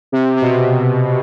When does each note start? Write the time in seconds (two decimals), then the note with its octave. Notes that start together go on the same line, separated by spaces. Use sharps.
0.12 C3
0.36 C3
0.42 B2